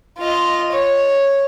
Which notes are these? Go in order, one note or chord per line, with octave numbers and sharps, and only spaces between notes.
F4 D#5
C#5